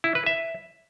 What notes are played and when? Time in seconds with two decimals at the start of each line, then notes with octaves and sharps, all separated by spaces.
0.04 E4
0.15 B4
0.26 E5